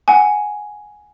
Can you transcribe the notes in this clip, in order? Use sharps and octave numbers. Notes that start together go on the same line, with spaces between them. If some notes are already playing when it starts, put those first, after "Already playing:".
F#5 G#5